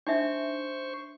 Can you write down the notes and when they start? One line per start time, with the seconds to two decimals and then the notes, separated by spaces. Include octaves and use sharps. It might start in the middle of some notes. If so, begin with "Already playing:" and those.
0.07 D4 D#4 C5 E5 C#6